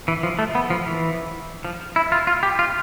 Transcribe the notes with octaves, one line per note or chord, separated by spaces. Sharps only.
E3
F3
A3
B3
F3
E3
F3
E4
F4
F4
G4
F4